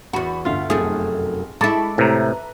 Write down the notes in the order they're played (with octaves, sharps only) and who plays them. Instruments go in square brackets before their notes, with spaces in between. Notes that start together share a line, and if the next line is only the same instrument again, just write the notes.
[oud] E2 F#4 [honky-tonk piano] B5
[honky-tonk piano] G1 D2 E5 [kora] F4 F5
[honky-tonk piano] F1 B1 [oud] F#2 A3 [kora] G#4
[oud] G#3 E4 [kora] A4 [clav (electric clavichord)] A5 [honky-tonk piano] B5 C#6 D6
[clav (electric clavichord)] A2 C3 [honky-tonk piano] B4 E5 A#5